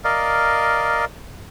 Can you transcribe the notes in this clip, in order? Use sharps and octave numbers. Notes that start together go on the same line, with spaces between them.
A#4 D5 D#5 F5